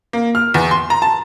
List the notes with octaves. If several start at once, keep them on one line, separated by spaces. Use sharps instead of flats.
A#3
F6
E2
C6
A#5
A5